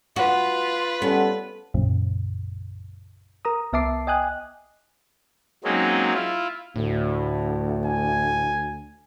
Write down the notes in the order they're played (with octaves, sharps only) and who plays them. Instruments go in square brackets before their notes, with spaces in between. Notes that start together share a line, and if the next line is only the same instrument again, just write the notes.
[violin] F4 [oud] F#4 [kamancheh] B4
[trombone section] G3 C#4 A4 [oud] B3
[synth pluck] B1 F#2 A#2 C#3
A#4 A#5 D#6
C2 B3 E5 A5 D6 C7
D#5 G5 G#5 D#6 F#6
[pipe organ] F#3 G#3 A#3 C4 C#4 D#4
E4 F4
[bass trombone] D2 [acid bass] A2
[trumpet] G#5